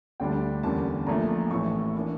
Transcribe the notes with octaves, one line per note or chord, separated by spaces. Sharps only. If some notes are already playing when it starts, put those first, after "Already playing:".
D2 D3 G3 D4 G5
E2 D3 G3 A#3 C#4 A5
A#1 A#2 F3 A3 D4 A#5
A1 A2 E3 A3 C#6
E3 A#3 D4